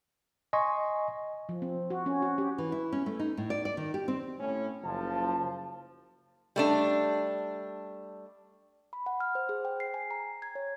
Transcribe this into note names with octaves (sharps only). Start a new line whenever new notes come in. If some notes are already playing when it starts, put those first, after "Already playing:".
D#5 G#5 C6 C#6
F3
C4
F#4
C#4
F#4
G4
E3
E4
C#4
A3
D#4
A2
D5
D5
D#3
G4
C4
A2 C#4
F#1 F3 A5
G3 A3 D4
B5
F#5
F6
C5
G#4
G5
C7
G#5
A#5
G#6
C#5